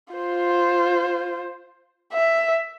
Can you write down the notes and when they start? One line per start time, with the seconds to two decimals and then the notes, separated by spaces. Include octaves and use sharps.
0.14 F4 C5
2.14 E5